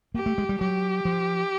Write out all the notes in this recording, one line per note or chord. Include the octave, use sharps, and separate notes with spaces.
A#3 G4
A3
G#3
G3
F#3 G4
F3